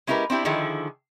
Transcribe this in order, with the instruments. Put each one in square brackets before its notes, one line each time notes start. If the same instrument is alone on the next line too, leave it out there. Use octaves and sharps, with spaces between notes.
[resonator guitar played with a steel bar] G#3 C#4 E4 G4 A#4 B4
C4 D4 E4 G4
D3 D#3 F3 E4 G#4